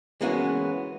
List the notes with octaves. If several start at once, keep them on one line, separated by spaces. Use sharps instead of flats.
E3 G#3 A#3 B3 C#4 F#4